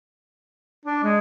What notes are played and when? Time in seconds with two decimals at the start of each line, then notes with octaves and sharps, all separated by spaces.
0.86 D4
1.03 G#3